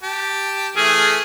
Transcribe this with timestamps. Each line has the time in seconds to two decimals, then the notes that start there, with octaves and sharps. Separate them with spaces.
0.03 G4 A5
0.76 E3 A3 G#4 F6